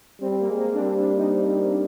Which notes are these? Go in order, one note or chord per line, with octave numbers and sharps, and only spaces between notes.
G3 C4
C4
A#3
G#3
A#3
D4
G3 C4
D4
D#4